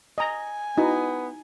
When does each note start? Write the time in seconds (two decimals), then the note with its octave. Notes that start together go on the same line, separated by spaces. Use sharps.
0.18 D#5 G#5 A#5
0.78 B3 D#4 E4 F#4